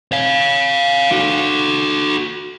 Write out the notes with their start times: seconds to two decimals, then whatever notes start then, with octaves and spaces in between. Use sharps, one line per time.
0.12 C#5 F5
1.12 F#4 A4